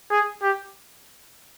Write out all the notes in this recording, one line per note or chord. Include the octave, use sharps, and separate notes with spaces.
G#4
G4